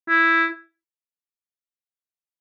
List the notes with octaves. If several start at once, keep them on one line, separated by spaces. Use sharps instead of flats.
E4